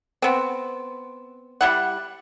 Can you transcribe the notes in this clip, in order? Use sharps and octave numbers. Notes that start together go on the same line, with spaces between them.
B3 C4
G3 E4 F#5